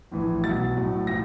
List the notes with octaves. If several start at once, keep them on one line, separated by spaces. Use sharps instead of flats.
A#1 A2 E3
C2 B2 F#3 A6
B1 A2 F#3
A2 F3 A#6